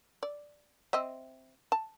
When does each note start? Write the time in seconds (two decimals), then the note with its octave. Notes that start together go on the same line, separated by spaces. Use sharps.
0.23 D5
0.93 C4 D#5 E5
1.72 A5